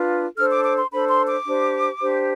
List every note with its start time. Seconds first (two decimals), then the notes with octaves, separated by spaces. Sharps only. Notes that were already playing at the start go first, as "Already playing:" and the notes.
Already playing: D4 F4 B4
0.36 D4 A4 C5 F6
0.50 D6
0.64 D6
0.78 C6
0.91 D4 A4 C5 B5
1.10 C6
1.28 D6
1.46 D4 G4 C5
2.01 D4 G4 C5